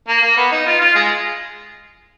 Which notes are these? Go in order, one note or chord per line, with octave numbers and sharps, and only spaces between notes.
A#3
A#3
B3
D#4
F4
F4
G#3